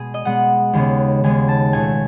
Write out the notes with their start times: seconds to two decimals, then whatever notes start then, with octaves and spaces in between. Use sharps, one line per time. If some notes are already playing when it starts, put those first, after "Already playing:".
Already playing: B2 G#3 B3 G#4
0.14 D#5
0.25 B2 G#3 B3 F#5
0.73 D#2 C#3 G#3 B3
1.24 D#2 C#3 G#3 B3 G#5
1.48 A5
1.73 C#2 B2 A3 G#5